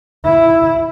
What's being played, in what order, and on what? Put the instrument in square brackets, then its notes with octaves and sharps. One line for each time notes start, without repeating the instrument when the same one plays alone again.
[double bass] E4